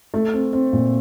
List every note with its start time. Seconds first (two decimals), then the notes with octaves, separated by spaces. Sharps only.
0.14 A3
0.33 C4
0.53 C4
0.73 A#2